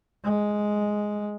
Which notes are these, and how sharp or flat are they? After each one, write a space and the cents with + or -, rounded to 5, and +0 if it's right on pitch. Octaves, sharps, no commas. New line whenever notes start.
G#3 +5